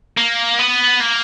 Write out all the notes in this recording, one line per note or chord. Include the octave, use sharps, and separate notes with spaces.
A#3
B3
A#3